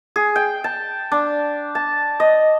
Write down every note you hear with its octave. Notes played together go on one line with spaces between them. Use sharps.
G#4
G5
A5
D4
A5
D#5